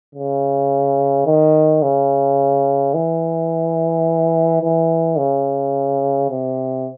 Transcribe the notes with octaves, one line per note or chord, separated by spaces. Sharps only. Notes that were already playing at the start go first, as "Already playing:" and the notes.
C#3
D#3
C#3
E3
E3
C#3
C3